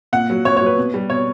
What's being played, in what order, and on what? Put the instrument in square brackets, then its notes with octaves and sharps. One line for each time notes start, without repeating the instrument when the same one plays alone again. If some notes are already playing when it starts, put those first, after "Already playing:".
[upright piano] A#2 F#5
F#3
A#2 C#5
C#5
F#3
B4
B2
G3
B2 C#5